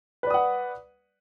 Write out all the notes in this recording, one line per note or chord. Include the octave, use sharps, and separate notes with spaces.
B4 D5 F#5 D#6